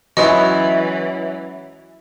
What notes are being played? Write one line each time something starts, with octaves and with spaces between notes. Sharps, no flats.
E3 F#3 G#3 B3 C#4 E4 C#5 D#5